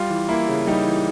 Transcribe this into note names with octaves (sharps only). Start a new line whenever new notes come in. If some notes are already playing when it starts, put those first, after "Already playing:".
Already playing: G3 F4
E3
A#3 E4
C#3
G3 D#4
E3